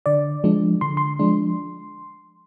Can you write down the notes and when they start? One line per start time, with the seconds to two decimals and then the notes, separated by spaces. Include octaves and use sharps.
0.06 D3 D5
0.44 F3 G#3 D4
0.81 D3 C6
0.97 C6
1.19 F3 G#3 D4